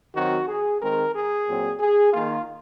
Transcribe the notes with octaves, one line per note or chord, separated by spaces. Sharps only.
D#3 F#3 C4 F#4
G#4
D#3 G#3 C4 A#4
G#4
A#2 F#3 C4
G#4
D#3 A#3 F4